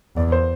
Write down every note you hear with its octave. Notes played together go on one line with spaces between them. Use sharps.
E2 D5
C5